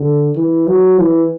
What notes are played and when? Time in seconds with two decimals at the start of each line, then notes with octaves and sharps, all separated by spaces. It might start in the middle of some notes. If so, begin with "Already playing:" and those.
Already playing: D3
0.36 E3
0.67 F#3
0.98 E3